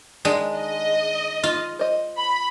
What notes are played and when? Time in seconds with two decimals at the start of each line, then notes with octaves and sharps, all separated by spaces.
0.25 D#3 G#3 D4
0.57 D#5
1.43 F4
1.79 C5 D#5
2.18 B5